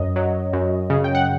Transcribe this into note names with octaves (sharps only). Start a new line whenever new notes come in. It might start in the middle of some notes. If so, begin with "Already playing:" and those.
Already playing: F#2 D#5
F#3
F#2
C#3
G5
F#5